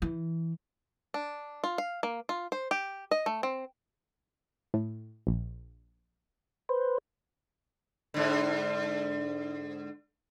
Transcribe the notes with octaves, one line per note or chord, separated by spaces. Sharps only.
E3
D4
F4
F5
A#3
F4
C5
G4
D#5
A3
C4
A2
A#1
B4 C5
G#2 D3